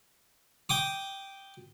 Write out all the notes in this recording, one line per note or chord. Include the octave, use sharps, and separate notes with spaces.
G5 D6 D#6